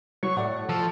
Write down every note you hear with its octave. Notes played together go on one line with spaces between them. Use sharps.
F#3 C#6
A2 D5 F#5
F3 A4